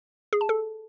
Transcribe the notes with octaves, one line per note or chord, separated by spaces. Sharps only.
G#4
A5
A4